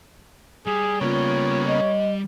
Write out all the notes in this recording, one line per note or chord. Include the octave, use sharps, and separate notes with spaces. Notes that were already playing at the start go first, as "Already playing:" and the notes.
G3 G#4
C#3 A#3 B3 F4 C#5
D#5